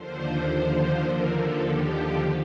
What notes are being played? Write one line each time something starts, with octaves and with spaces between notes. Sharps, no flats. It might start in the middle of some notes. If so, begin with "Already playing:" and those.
Already playing: D#2 D3 F3 C5
C5
A#4
A4
G4